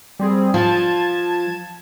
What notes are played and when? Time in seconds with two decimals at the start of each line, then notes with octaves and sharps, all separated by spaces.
0.19 G3 C4 G#4
0.54 F3 F4 A5 G#6